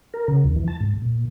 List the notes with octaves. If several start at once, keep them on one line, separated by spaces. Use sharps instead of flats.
A#4
C#3
D#2
E3
A5
G#2
A#2